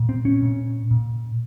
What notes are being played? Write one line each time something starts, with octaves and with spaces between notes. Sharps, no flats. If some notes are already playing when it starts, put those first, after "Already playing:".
Already playing: A#2
C4
C#4
A#2
A#2